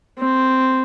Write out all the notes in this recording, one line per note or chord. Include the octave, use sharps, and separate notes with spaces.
C4